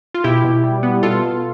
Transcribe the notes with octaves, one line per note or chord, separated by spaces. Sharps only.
F4
B2 E4 G4
B2
G3
B3
B2 F4 A4
B2